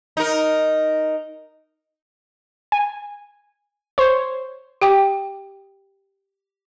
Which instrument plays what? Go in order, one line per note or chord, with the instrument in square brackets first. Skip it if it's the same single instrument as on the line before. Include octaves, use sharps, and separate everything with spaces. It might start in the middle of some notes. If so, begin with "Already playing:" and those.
[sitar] D#4 A#4
[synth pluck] G#5
C5 C#5
[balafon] G4 G5 D6